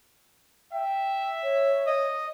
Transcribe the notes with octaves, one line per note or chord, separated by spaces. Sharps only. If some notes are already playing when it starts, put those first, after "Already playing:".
E5 G5
C#5
D#5